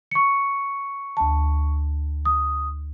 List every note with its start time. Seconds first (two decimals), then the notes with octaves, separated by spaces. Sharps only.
0.11 C#6 C#7
1.17 D2 A5
2.25 D#6